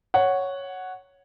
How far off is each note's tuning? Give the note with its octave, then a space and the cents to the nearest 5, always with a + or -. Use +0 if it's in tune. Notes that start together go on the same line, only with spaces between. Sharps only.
C#5 +0 F#5 +0